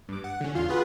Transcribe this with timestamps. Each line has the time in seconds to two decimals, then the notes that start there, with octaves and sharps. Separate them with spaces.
0.09 G2 D6
0.24 F#5
0.41 D3 C#4
0.55 A1 E2 F4 C6 F6
0.68 F4 F#4 G#4 B4 F#5